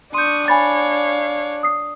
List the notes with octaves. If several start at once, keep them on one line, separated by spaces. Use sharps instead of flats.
D4 C6 C#6 D#6 G6
C#5 F5 G#5 B5 A6
D#6 C7